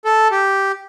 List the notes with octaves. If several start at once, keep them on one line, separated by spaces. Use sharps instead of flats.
A4
G4